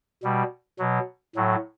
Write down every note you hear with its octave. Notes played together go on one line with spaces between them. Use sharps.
B2 G3
B2 F#3
A2 F#3